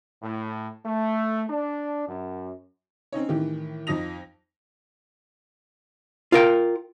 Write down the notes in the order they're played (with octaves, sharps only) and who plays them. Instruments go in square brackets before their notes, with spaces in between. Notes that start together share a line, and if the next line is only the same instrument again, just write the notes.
[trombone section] A2
A3
D4
F#2
[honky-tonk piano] C4 C#4 D#4 C#5
A2 D#3 E3 G4
F2 F3 D#4 D#6 A#6 F7
[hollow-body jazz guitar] F4 A#4 G5